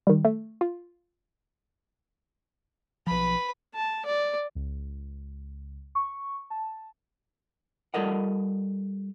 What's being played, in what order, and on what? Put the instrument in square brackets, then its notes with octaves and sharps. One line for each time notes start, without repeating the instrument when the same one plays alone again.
[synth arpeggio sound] D#3 G3
A3
F4
[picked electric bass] B1 F3 [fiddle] B4 B5
[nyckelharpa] A5
D5
[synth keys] C#2
C#6
A5
[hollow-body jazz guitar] G3 F4 A4 A#4 D#5 F#5